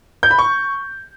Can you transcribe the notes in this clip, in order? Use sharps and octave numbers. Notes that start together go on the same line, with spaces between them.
G6
B5
C#6